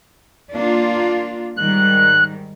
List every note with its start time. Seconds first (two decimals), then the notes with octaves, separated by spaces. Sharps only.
0.54 A#3 D4 F4
1.57 G#2 D#3 G3 F#6